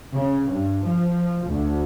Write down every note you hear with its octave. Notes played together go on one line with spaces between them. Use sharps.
C#3
G2
F3
D2